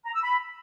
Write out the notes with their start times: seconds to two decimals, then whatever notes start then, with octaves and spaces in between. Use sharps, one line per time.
0.05 A#5
0.14 E6
0.23 B5